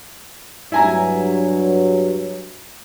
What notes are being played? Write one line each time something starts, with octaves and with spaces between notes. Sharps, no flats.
G2 F#3 E4 G#5 A#5